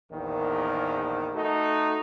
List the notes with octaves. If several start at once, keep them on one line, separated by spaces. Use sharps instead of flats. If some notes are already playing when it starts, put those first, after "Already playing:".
A#1 E2 D#3
A3 D#4 F#4